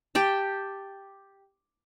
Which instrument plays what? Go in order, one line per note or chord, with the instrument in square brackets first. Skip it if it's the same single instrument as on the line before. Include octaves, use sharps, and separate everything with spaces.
[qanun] G4 G5 A5